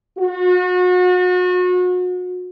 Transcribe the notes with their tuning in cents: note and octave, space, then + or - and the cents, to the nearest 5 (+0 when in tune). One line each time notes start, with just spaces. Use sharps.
F#4 -35